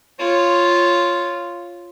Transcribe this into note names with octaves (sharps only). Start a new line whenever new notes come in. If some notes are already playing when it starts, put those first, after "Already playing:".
F4 C#5